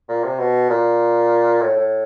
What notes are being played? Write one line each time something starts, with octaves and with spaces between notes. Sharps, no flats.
A#2
C3
B2
A#2
A2
A2